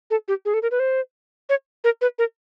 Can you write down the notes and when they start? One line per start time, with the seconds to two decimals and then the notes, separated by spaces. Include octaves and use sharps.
0.11 A4
0.28 G4
0.45 G#4
0.54 A4
0.62 A#4
0.71 B4
0.80 C5
1.49 C#5
1.84 A#4
2.01 B4
2.19 A#4